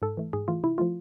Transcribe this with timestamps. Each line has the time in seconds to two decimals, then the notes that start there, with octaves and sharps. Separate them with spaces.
0.02 G#2 A4
0.17 E3 A3
0.33 G#2 G#4
0.48 E3 A3 F4
0.63 C3 E4
0.78 F3 A3 F4